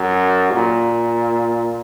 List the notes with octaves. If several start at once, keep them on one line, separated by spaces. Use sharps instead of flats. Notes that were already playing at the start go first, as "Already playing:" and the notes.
Already playing: F#2
A#2